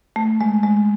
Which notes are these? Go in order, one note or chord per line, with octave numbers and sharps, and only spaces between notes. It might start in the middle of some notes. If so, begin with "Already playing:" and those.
A3
G#3
G#3